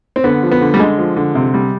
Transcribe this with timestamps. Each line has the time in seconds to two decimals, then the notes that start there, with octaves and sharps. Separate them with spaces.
0.16 C4
0.24 D3 B3
0.43 F3
0.51 B3
0.61 D3
0.74 G3
0.80 D3 G#3
0.98 F3
1.16 D3
1.35 C3
1.54 G3